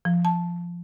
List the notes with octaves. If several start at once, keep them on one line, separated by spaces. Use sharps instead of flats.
F3
A5